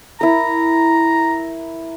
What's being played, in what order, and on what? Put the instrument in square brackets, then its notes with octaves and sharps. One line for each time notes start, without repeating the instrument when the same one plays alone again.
[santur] E4 A#4 [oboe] A#5